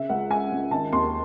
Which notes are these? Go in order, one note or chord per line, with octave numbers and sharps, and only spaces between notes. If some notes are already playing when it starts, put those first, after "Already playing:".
Already playing: C#3 E5
C#2 F#5
G#3 G#5
C#2
D#3 A5
D#2 C6